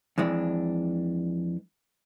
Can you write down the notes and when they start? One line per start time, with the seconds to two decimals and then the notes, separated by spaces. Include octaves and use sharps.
0.18 F2 E3 G#3 D4